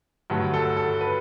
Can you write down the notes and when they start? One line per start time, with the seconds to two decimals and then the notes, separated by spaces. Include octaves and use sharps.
0.30 G2 D3 F#3 A3
0.54 A4
0.77 A4
1.01 B4